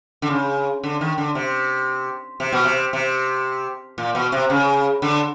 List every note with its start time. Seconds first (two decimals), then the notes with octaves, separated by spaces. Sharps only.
0.22 D3
0.31 C#3
0.83 D3
1.01 D#3
1.18 D3
1.35 C3
2.40 C3
2.52 B2
2.64 C3
2.93 C3
3.98 A#2
4.15 B2
4.32 C3
4.50 C#3
5.02 D3